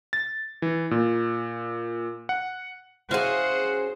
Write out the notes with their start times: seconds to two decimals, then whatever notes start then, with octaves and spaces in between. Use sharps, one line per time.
0.13 A6
0.62 E3
0.91 A#2
2.29 F#5
3.11 C#4 E4 F#4 G#4 C5 F5 F#5